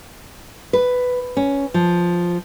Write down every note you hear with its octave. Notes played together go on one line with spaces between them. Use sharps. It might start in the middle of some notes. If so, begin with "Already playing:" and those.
B4
C#4
F3